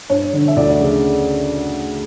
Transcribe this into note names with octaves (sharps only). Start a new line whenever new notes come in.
G2 C#5
D3
E5
D2 D5
C#3